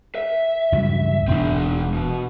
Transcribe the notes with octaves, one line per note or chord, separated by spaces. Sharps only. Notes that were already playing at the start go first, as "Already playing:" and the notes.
E5
C#2 G2 F#3
E1 G#3 C4 D4
B2